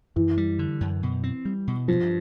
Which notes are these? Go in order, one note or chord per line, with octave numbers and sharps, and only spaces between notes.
F#2 E3
G3
D3
F#2
B2
C4
G3
B2
G2 F3